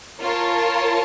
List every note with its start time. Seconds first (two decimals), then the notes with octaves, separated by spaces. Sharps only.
0.21 F4 A#4 C#5 A5